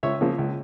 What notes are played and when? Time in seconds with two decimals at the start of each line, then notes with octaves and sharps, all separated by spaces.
0.03 C#2 C#5 E5
0.21 C#3 F3 A#3
0.38 C#2